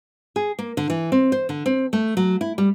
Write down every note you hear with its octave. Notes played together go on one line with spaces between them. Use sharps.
G#4
A#3
D3
E3
C4
C5
D3
C4
A3
F#3
E4
G3